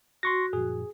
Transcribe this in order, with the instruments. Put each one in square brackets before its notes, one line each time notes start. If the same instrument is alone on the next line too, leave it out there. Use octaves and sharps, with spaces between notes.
[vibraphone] F#4 [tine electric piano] C6 C#6 A#6
[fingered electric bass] F#2 A#2 F3 [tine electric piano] G#4